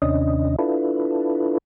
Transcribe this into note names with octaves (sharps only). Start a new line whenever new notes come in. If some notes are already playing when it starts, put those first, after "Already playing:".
D#2 C3 C#4 D4 D#5
D4 E4 F4 A4 B4